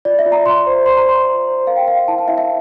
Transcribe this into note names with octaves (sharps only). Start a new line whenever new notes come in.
F4 D5
E5
F4
A#5
F4 C6
C5
C5 C6
A#5
F4 C6
C5
C5
A#4 F5
G5
A#4 F5
F5
E4 A5
F5
E4 E5
E5